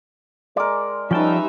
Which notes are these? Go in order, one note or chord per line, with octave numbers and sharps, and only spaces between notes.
G#3 A#4 D5
F3 G3 C#4 D#4 B4 E5 G5 A5